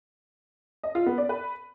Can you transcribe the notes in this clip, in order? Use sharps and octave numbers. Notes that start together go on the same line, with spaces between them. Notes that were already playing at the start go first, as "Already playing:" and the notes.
D#5
F4
B3
D5
B4